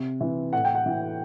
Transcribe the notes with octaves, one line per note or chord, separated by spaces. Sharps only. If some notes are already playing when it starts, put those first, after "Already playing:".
Already playing: C3
E3
A2 F#5
G5
F#5
E3